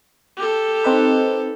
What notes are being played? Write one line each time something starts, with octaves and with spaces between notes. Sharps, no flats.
G4 A4
C4 D#4 B4